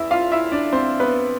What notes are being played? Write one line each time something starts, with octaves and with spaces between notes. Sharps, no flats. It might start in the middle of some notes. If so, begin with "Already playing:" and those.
Already playing: E2 E4 E5
F4 F5
E4 E5
D4 D5
C4 C5
B3 B4